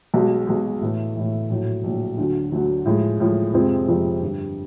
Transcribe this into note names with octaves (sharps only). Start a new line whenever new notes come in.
B1 B2 G#3
B1 B2 G#3
A2 E3 A3
A2 E3 A3
A#1 A2 F#3
A#1 A2 F#3
D2 D3 F#3
D2 D3 F#3
A2 F3 G#3
A2 F3 G#3
F2 C3 F3 G#3 C4
F2 C3 F3 G#3 C4
G2 D3 G3